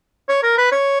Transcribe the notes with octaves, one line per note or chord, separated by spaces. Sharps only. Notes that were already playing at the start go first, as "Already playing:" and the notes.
C#5
A#4
B4
C#5